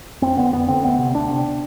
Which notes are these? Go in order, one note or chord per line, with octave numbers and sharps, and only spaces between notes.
F2 C4
D3 B3
F2 B3
D3 C4
D2 B3
C3
D2 D4
C3